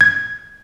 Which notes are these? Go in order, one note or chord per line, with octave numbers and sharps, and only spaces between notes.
G#6